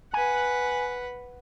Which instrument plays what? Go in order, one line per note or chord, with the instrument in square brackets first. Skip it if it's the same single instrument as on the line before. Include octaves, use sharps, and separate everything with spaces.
[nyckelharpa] B4 F#5 [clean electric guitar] G#5